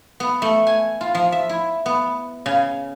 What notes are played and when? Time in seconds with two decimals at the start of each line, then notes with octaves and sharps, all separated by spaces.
0.20 B3
0.42 A3
0.67 G#5
1.01 F4
1.15 F3
1.32 E5
1.49 E4
1.86 B3
2.46 C#3